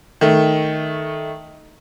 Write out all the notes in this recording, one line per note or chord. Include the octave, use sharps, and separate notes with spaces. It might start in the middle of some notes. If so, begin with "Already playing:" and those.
D#3 A3